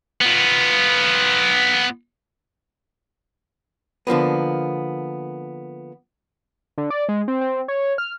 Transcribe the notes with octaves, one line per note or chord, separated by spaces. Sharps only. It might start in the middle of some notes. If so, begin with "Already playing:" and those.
B3 F4
D3 F3 A#3 B3
D3
D5
G#3
C4
C4
C#5
F6